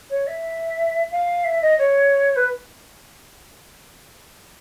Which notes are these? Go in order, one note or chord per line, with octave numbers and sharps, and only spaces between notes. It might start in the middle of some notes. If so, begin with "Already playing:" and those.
C#5
E5
F5
E5
D#5
C#5
B4